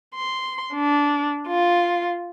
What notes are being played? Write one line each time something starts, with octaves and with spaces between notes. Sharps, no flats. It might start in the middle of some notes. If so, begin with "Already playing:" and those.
C6
D4
F4